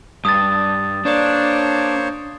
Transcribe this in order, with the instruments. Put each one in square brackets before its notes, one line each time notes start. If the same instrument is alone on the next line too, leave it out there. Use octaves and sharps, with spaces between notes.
[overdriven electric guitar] G2 [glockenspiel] D#6 A6
[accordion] A#3 C5 C#5 [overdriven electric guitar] D4